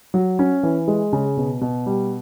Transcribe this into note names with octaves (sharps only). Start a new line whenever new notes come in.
F#3
C#4
E3
G#3
C#3
B2
B2
G3